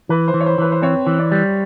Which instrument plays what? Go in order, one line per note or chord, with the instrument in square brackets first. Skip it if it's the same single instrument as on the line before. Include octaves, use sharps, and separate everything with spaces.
[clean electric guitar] E3 [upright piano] B4
[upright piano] C5
[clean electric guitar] E3
[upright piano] C#5
C5
[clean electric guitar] E3 [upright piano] B4
[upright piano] C5
[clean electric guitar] C4 [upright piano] C#5
[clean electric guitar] E3
[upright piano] D5
[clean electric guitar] G3